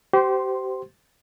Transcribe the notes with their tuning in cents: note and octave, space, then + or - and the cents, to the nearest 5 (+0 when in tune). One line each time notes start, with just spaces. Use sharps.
G4 -30 C5 -20 C6 +0